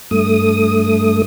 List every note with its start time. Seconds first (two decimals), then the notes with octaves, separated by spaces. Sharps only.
0.11 G2 A3 D#6